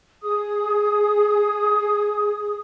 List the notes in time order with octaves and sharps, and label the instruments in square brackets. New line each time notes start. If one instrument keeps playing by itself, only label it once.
[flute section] G#4 D#6